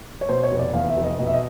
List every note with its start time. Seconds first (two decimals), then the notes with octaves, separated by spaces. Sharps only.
0.21 C#5
0.29 B2 C5
0.43 C#5
0.52 F1
0.59 D5
0.74 E2 F5
0.89 E5
0.97 F1
1.04 D#5
1.19 B2 D#5
1.26 E5
1.33 D#5